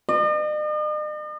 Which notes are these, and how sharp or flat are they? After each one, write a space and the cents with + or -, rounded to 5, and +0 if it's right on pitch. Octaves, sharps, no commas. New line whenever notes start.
D#5 -45